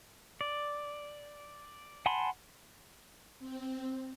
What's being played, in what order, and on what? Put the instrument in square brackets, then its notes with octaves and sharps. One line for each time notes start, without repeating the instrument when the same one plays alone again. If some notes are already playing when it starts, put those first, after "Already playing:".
[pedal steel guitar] D5
F#5 G#5 A5 B5 C6
[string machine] C4